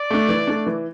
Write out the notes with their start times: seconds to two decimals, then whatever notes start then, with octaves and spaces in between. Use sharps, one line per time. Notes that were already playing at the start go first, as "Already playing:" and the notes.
Already playing: D5
0.10 A3 D4
0.29 E3
0.47 A3 D4
0.66 E3